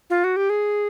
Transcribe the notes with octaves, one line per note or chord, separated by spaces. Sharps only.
F4
F#4
G4
G#4